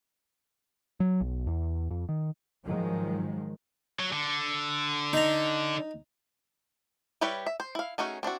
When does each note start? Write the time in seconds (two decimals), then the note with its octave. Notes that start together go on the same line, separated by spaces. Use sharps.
1.00 F#3
1.21 B1
1.47 E2
1.91 F2
2.09 D#3
2.64 G#2 D#3 F3 F#3 G#3
3.99 F#3
4.12 D3
5.13 D#4 A#5
7.21 G3 E4 G4 B4 C#5
7.46 E5
7.60 C5
7.75 E4 F5
7.98 A3 C#4 D#4 F#4 G#4
8.23 C4 D4 E4 F#4